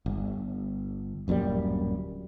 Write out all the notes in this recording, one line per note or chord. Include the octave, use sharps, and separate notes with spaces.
G1
D1 F#2 A#2 G3